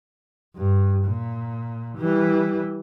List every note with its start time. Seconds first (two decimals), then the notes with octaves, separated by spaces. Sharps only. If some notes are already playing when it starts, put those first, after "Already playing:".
0.56 G2
1.05 A#2
1.97 E3 G3